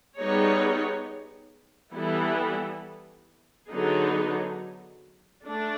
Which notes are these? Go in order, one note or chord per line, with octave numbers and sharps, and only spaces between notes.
G3 B3 D#4 G#4 C#5
E3 G3 B3 E4 A4
D3 F#3 B3 D#4 G#4
A3 D4